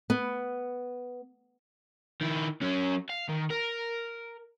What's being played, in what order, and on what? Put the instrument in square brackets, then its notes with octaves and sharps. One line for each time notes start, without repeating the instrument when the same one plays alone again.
[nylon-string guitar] B3
[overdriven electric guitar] D#3 E4
F#3 C#4
F5
D#3
A#4